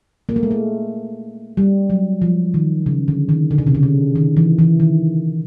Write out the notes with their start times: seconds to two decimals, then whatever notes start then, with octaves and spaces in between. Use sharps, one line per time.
0.29 A#3
0.36 A3
0.43 G#3
0.51 A3
1.57 G3
1.90 F#3
2.22 F3
2.54 D#3
2.86 C#3
3.08 D3
3.29 D#3
3.51 D3
3.58 C#3
3.67 C3
3.75 C#3
3.83 D3
4.16 D#3
4.37 E3
4.59 E3
4.80 D#3